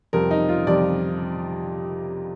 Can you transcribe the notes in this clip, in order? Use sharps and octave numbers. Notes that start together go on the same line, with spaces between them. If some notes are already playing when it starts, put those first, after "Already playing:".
F2 C3 G3 A#4
D#4
F4
F2 C3 G3 D5